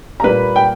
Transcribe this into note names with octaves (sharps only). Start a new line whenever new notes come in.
A#5
A#2 G3 A#3 B4 B5
G5